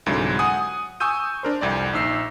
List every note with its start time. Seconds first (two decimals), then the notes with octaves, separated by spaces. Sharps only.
0.06 C2 G#2 D3 F#3 G#3
0.39 F#5 G#5 D#6
1.00 G#5 C#6 D#6 E6 G6 D#7
1.43 D4 A#4 C5
1.61 C2 F2 D5
1.93 A#1 D#4 E6 C7